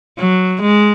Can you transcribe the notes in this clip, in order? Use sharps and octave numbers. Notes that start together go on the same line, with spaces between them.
F#3
G#3